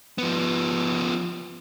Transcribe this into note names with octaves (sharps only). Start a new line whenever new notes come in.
F3 B3